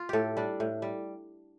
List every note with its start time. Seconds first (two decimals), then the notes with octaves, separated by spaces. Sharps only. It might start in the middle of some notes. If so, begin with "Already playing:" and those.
Already playing: F4
0.09 A2 G4 A4
0.37 G3 D4
0.60 A2
0.82 G3